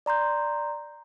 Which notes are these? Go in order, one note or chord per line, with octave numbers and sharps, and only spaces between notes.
D5 A#5 C6 G6